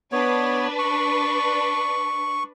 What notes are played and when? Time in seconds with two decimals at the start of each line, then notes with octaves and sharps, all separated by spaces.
0.12 B3 D4 B4 C#5
0.79 C#6